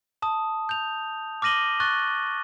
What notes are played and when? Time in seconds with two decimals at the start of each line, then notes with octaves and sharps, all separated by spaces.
0.22 A5 D#6
0.69 G6 F7
1.42 D6 F6 A#6 D#7 F#7 G7
1.80 C#6 F#6 A6 G7